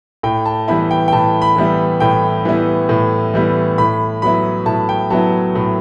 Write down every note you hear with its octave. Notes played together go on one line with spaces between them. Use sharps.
A2 G5
A5
E3 G3 B3 E4 B5
G5
G5
A2 A5
B5
E3 G3 B3 E4
A2 G5
E3 G3 B3 E4
A2
E3 G3 B3 E4
A2 B5
F#3 B3 E4 B5
A2 A5
G5
F#3 B3 E4 A5
A2